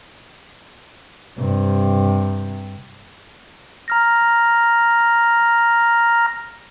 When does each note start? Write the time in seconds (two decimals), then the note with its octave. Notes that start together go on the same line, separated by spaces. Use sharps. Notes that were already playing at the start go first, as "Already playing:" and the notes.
1.38 G2 C3
3.88 A#5 F6 A#6